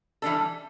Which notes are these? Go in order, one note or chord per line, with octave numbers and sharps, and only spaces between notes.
E3 G3 D4 A4